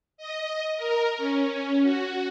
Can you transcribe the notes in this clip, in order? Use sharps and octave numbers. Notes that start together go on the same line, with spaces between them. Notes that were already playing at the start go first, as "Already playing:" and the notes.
D#5
A#4
C#4
F#4